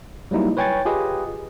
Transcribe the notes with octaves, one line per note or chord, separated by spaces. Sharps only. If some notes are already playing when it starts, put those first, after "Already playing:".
F#3 G3 A#3 D#4 E4
B4 C#5 G5 G#5 C#6 A6
F4 G4 G#4 B4 D#5